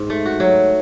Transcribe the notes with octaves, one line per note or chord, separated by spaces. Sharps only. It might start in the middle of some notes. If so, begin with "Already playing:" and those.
Already playing: G#2
A3
F#4
F#3